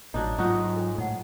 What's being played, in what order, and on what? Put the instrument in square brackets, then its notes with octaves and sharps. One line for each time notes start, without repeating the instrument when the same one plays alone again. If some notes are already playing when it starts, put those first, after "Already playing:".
[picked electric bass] A1 [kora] F#3 D4 D#4
[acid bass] G#2 [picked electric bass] F#3 [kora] D#4 F#4 [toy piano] F4 C#6 D#6
[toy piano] A4 G5
[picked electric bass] A2 [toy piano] D#4 F#5